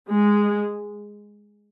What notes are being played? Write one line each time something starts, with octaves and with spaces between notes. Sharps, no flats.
G#3